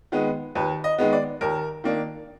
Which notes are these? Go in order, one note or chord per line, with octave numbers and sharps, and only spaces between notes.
D#3 G#3 B3
D#2 B4
D#5
D#3 G#3 B3
D5
D#2 A#4
D#3 A#3 D4